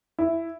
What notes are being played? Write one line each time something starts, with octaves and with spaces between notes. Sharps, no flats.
E4